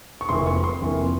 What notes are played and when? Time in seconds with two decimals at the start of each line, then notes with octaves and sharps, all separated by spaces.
0.21 C#6
0.29 F1 F2 E3 A#3 C6
0.46 C#6
0.64 C6
0.82 F1 F2 E3 A#3